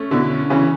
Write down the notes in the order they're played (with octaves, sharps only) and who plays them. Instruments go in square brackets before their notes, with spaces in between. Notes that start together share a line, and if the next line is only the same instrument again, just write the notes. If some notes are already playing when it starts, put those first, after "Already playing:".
Already playing: [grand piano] A3 C#4
[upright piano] B2 D3 [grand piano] E4
[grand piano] C#4
[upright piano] C#3 E3 [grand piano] C#4